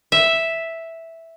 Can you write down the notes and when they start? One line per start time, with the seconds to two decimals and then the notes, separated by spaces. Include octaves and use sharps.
0.12 E5